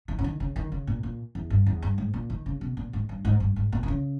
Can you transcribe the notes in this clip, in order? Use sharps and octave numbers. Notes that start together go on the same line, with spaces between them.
D#3
C#3
D#3
C#3
D#3
C#3
A#2
A#2
E2
G2
E2
G2
G#2
A#2
D#3
C#3
B2
A#2
G#2
G2
G#2
G2
G#2
A#2
D#3
C#3